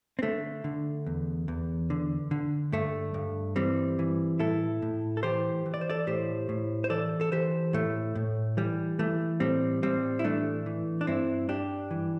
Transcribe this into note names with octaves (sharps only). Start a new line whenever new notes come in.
C4
D3 A3
D3
E2
E2
D3
D3
G2 A3
G2
E3 G3 C4
E3
A2 E4 A4
A2
A4
E3 G4 C5
E3
D5
C5
A4 D5
A2 G4 C5
A2
C5
E3 A4 D5
A4
E3 G4 C5
A2 A3
A2
E3 G3
E3 A3
A2 G3 C4
A2 G3 C4
E4
E3 A3 D4
E3
D4
G2 C4 E4
G2 D4 G4
E3